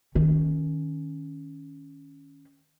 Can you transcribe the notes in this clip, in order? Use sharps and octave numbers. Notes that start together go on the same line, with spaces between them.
D#3 C#4